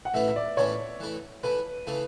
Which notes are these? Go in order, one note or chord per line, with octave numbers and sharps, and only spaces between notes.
F#5
A2 E3 A3 C#4 E4 E5
E5
D5
A2 E3 A3 C#4 E4 C#5
E3 A3 E4
E3 A3 E4 B4
C#3 E3 A3 E4